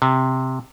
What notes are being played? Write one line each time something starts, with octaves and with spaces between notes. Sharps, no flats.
C3